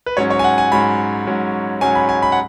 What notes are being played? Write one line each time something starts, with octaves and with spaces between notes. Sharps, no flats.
B4
G#2 F#3 C#4 C#5
C#5
G#5
F#5
G#5
G#2 F#3 C#4 B5
G#2 F#3 C#4
G#2 F#3 C#4 G#5
B5
G#5
B5
F#5